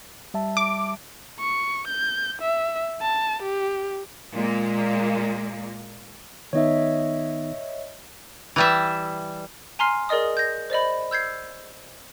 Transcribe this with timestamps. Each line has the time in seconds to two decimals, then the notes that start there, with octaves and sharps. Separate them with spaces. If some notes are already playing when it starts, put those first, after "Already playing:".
0.34 G3 E5 A5
0.57 D6
1.40 C#6
1.88 G6
2.41 E5
3.02 A5
3.42 G4
4.34 A#2 G#3 A#3
6.53 D#3 B3 D#4 C#5 D#5 E5
8.56 E3 G3 E5
9.79 G#5 A#5 C6 F6 C7
10.09 G#4 A#4 D5 D#5 D#6
10.37 G6 A#6
10.70 C5 D5 D#5 B5
11.11 E6 G6 G#6 C7